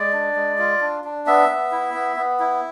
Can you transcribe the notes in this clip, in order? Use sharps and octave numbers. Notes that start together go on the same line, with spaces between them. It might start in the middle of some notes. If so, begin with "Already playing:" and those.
Already playing: G#3 D5
D4
G#3
F4
D4
D4
B3 E5
B3
E4
B3
B3
E4